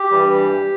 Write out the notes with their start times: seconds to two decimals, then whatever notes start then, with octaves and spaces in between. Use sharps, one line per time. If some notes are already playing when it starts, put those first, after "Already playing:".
Already playing: G4
0.11 G2 E3 G3